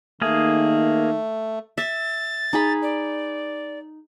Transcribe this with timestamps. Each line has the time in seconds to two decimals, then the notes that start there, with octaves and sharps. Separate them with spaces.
0.22 D#3 A3 A#3 G#4
1.78 E5 A6
2.53 D#4 G#4 B5
2.82 D5